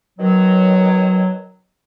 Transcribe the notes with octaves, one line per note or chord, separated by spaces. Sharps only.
B2 D#3 F#3